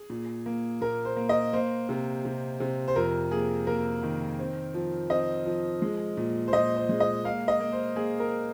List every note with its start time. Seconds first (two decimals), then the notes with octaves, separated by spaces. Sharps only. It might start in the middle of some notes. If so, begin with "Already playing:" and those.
Already playing: G#4
0.10 A#2
0.46 A#3
0.81 A#2 A#4
1.05 C5
1.17 A#3
1.29 D#5
1.53 A#3 C5
1.89 C3
2.25 C3
2.60 C3
2.88 C5
2.96 F2 A#4
3.31 A#3 G#4
3.67 A#3 A#4
4.03 D#3
4.39 C4
4.74 F3
5.10 C4 D#5
5.46 F3
5.82 G#3
6.17 A#2
6.48 C5
6.53 A#2 D#5
6.77 C5
6.89 G#3
7.00 D#5
7.24 A#3 F5
7.48 D#5
7.60 A#3
7.72 C5
7.96 A#3 G#4
8.20 A#4